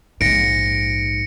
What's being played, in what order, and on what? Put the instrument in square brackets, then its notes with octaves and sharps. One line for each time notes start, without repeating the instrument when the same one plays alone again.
[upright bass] A#1 G#2 [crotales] A#6 C#7 D7